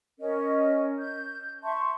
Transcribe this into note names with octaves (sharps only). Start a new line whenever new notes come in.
C#4 A#4 D#5
G6
E5 A5 C6 C#6